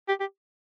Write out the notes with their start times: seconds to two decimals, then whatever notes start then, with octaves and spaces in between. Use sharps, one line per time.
0.08 G4
0.20 G4